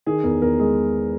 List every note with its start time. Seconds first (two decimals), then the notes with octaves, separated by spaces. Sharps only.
0.06 D#3 G#4
0.24 E2 A#4
0.42 E2 A#4
0.59 G#3 G#4